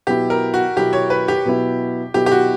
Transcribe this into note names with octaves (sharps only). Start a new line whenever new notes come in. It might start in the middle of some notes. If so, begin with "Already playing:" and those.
B2 F#3 B3 E4 G4
A#4
F#4
B2 F#3 B3 E4 G4
C#5
B4
G4
B2 F#3 B3 E4
B2 F#3 B3 E4 G4
G4
F#4